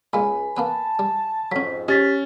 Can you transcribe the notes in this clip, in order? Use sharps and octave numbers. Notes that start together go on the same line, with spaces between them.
C#2 A#2 G#3 G#5 B5
A#3 B3 B4 A5
G3
F2 G#2 F#3 C#4 B6
C#4 G4 D#5 A6 B6